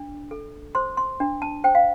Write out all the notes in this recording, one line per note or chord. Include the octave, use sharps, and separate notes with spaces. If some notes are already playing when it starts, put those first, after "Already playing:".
Already playing: D4
A4
C5 C6
C6
D4
A5
C5 G5
F5